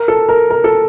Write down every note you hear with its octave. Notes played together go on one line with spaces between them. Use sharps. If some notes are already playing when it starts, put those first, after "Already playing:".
Already playing: A#4
A4
A#4
A#4
A4